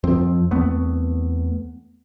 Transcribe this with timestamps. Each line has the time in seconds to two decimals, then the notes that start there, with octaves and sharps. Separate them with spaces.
0.04 F2 F3 C4
0.51 E2 A3 B3 C4